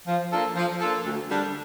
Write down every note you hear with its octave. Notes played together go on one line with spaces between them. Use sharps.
F3
A#3 D4 F4 A4
F3
A#3 D4 F4 A4
D2
D3 G3 D4